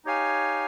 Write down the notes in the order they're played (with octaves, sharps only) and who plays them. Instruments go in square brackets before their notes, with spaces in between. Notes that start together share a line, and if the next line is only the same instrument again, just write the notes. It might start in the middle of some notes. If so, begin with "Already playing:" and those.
[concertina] D#4 G4 C#5 F5 G#5